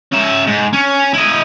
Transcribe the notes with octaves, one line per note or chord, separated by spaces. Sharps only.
C#4 E5
G#2
C#4
E4 D#5